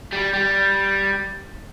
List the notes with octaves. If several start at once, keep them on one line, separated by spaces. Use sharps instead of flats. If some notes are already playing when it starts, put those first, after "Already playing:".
G3
G3